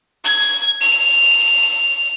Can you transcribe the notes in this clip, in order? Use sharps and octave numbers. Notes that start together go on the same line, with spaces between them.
G#6
F7